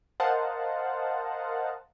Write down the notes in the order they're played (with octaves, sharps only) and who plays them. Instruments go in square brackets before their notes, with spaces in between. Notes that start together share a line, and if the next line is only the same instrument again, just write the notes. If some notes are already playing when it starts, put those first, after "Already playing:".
[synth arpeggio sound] A#4 C5 D#5 F5 F#5 A5